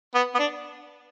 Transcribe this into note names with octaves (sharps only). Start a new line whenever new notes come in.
B3
B3
D4